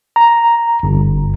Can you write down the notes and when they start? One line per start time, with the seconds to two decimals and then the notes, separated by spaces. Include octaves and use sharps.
0.16 A#5
0.83 G1